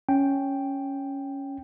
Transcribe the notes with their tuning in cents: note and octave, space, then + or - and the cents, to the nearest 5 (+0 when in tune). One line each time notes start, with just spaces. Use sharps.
C#4 +0 G5 +0